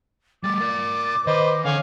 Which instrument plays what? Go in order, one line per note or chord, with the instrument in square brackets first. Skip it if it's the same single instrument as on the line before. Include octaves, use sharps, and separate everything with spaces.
[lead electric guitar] G3 A3 [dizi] D6 [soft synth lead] A6
[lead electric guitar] A#4 D5
[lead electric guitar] D#3 [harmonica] B4 C5 [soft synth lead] D#5
[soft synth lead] D3 [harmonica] C#4 F5 G#5